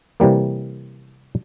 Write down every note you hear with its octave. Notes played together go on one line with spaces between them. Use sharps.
C3 E3 G3 A#3